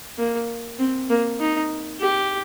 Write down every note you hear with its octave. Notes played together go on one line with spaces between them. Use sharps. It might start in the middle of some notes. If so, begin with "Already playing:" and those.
A#3
C4
A#3
D#4
G4